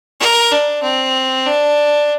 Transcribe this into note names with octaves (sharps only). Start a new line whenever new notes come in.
A#4
D4
C4
D4